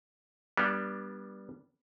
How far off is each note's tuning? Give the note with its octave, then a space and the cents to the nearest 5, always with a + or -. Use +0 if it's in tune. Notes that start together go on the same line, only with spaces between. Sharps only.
G3 +0 B3 -30 D4 +0